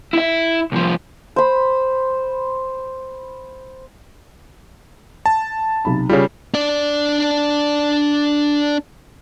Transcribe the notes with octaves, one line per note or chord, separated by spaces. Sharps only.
E4 E5
C2 F3
C5 B5
A5
B1 C3 B5
C#3 G3 F4 G#4 C#5
D4 D5